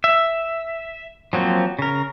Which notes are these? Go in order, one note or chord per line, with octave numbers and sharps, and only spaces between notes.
E5
F3 F#3 A#3 C4
C#3 A#4